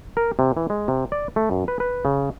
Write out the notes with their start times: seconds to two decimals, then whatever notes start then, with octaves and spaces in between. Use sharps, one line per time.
0.17 A#4
0.39 C3
0.57 E3
0.70 G#3
0.88 C3
1.12 D5
1.36 A3
1.51 F#2
1.68 B4
1.80 B4
2.05 C#3